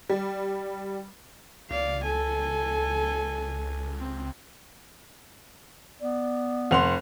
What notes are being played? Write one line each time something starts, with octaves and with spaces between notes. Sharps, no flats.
G3
C#2 D5 F5
A4 G#5
C4
B3 D5
F1 F#5 C6 F7